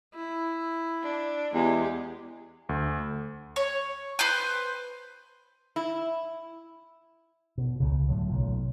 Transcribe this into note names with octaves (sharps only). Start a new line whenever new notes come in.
E4
D4
E2 G#3 G4
D2
C#5
B4 C5 G6
E4
B2
C#2 C#3
A2 D3 F#3
B1 A#2